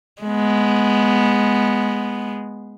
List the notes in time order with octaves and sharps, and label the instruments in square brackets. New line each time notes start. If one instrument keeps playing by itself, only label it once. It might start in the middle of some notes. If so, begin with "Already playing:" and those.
[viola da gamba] G#3 B3